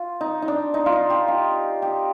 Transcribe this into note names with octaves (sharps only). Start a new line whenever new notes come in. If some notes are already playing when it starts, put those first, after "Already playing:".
Already playing: F4
D#4
D#4
D4
D#4
F4
D#4
G4
F4
G4